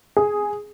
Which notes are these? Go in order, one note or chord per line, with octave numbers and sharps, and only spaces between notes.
G#4